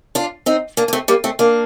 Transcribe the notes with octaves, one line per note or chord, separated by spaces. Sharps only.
D4 F4
C4 D#4
A#3 D4
A#3
A3 C4
G3 A#3
A3 C4
A#3 D4